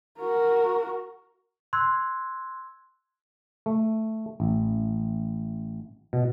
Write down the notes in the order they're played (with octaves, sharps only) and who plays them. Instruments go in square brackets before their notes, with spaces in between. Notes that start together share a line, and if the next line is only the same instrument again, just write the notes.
[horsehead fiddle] F#4 A#4
[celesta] C6 E6 F#6 G#6
[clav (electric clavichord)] A3
A1
B2